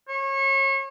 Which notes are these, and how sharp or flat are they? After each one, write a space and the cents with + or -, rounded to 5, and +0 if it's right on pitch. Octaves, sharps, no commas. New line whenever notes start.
C#5 -30